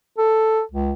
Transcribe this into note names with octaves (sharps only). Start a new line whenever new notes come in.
A4
C#2